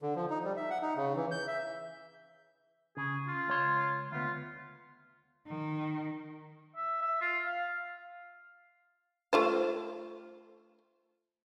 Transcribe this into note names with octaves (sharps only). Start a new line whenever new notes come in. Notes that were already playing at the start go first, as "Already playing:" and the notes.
D3
F3
D#4
G3
E5
F#5
D#4
C#3
E3
G6
E5
C#3 G#4
F4
C#2 C#5 C6
D2 B3 F4
D#3
E5
E5
F4
F5
A3 F4 C5